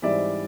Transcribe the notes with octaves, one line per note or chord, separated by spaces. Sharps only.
G#2 E3 G3 C4 D5 E5